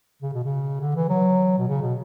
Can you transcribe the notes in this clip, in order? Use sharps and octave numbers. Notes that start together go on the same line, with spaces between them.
C#3
B2
C#3
D3
E3
F#3
B2
C#3
B2